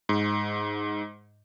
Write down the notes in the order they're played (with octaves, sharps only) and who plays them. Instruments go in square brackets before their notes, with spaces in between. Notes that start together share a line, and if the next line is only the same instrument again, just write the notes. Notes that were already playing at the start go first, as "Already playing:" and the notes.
[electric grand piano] G#2